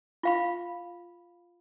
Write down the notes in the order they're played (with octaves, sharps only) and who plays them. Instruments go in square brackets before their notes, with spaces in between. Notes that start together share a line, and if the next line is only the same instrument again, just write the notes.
[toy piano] F4 F5 B5